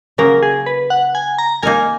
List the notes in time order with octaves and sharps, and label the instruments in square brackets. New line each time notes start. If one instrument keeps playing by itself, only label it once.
[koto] C#3 F#3 A#3 [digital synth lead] A#4
[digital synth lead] G#4
B4
F#5
G#5
A#5
[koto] A#3 D#4 A#4 [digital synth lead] G#5